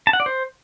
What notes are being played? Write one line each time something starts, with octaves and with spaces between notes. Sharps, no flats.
A5
F#5
D5
C5